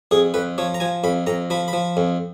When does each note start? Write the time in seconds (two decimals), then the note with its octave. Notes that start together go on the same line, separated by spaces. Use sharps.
0.11 F2 G#4
0.34 F2 B4
0.58 F3 C#5
0.74 A#5
0.80 F3 G#5
1.04 F2 B5
1.27 F2 A#5
1.50 F3 B5
1.68 B5
1.73 F3
1.97 F2